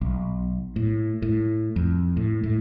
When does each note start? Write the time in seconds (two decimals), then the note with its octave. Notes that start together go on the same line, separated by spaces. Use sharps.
0.01 B1
0.76 A2
1.22 A2
1.76 F2
2.17 A2
2.43 A2